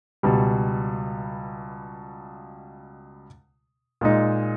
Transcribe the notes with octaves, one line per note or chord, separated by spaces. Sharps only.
C#2 B2 G3
A#2 G#3 D#4